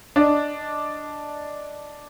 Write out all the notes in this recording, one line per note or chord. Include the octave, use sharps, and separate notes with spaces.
D4 D5 D#5